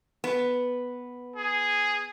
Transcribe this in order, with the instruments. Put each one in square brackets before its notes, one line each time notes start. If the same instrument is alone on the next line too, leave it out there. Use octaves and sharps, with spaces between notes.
[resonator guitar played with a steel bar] B3
[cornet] G#4